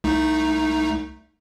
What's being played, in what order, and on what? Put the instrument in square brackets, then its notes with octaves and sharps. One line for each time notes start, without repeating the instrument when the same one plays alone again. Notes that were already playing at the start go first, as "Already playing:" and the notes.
[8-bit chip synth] C2 A3 D#4